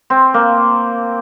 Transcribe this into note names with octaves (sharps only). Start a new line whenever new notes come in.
C4
A#3